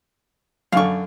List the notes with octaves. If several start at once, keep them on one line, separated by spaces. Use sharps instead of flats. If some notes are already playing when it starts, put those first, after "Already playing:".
F#2 D3 F5 C#6